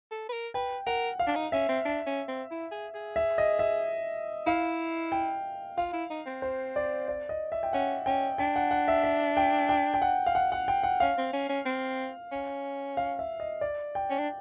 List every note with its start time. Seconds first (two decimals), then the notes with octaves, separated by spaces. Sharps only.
0.11 A4
0.29 B4
0.33 A#4
0.54 B4 G5
0.87 A#4 F#5
1.19 F5
1.27 D4
1.35 D#4
1.52 C#4 E5
1.69 C4
1.85 D4
2.06 C#4
2.28 C4
2.51 E4
2.72 G#4
2.94 G#4
3.16 E5
3.38 D#5
3.59 E5
4.46 E4 F5
5.12 G5
5.77 F4 F5
5.93 E4
6.10 D#4
6.26 C4
6.42 C5
6.76 D5
7.08 D5
7.29 D#5
7.52 E5
7.63 G5
7.73 C#4 F#5
8.06 C#4 G5
8.38 D4 G5
8.56 F#5
8.71 F#5
8.88 E5
9.04 E5
9.37 G5
9.69 G5
9.94 G5
10.02 F#5
10.26 F5
10.35 F#5
10.52 F#5
10.68 G5
10.83 F#5
11.00 C#4 F5
11.17 C4
11.33 C#4
11.49 C#4
11.65 C4
12.32 C#4
12.97 F5
13.19 E5
13.40 D#5
13.61 D5
13.95 G5
14.10 C#4
14.19 D4